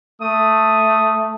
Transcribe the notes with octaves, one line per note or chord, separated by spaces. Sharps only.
A3 D#6